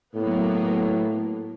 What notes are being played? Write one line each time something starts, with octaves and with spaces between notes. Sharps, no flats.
A2 F#3 A#3 B3